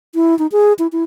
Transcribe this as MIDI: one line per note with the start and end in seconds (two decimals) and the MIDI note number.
0.15 0.37 64
0.39 0.47 63
0.52 0.73 68
0.79 0.87 64
0.92 1.04 64